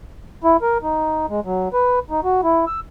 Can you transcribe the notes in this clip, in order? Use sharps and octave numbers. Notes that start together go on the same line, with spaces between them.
E4
A#4
D#4
G#3
F#3
B4
D#4
F#4
E4
E6